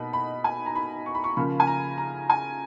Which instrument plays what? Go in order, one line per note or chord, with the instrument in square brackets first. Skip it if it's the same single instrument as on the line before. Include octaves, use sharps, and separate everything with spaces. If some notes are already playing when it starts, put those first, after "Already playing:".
Already playing: [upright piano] B2 A#3 D#4 B5
B5
G#5
A#5
B5
C#6
B5
C#6
C#3 F3 A#3 B5
G#5
A#5
A#5
G#5